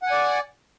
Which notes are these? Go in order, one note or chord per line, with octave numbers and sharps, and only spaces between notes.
D5 F#5 G#5